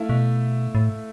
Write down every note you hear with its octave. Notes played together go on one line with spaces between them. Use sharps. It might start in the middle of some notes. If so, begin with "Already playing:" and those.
Already playing: A3 E4 F5
B2
A2